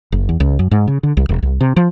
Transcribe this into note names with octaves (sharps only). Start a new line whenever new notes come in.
F#1
E2
C#2
F#2
G#2
C#3
D3
C2
E1
C2
C3
F3